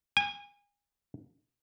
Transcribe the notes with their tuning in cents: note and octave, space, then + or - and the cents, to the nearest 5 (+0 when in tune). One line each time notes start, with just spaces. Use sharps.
G#5 -30